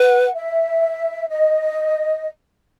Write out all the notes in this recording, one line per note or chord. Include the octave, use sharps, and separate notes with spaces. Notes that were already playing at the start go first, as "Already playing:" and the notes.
Already playing: B4 F#5
E5
D#5